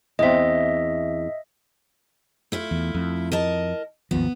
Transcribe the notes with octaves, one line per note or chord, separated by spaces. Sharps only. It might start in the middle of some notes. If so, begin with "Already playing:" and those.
E2 C4 D#5 E5
A3 E4 F4
E2
F2
A#4 D#5 A5
G#1 D#2 F3 B3